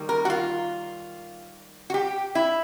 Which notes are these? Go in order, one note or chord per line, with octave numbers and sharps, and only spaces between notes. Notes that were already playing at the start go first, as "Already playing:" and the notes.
Already playing: D#3 G3 A#3
A#4
F#4
F4
F#4
G4
E4